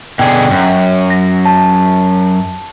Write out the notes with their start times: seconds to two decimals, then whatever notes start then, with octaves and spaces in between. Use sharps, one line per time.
0.19 B2 D3 G#4 G5
0.51 F#2
1.10 A#6
1.46 A5